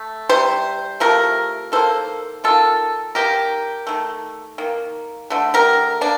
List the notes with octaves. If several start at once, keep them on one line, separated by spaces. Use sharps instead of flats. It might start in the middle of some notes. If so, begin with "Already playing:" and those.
Already playing: A3
C3 G3 C5
C3 F3 A3 A#4
D#3 A#3 A4 C5
D#3 G3 A#3 F4 A4
D#3 G3 A#3 G4 A#4
D#3 A3
D#3 A#3
D3 A3
G4 A#4
A#3 D4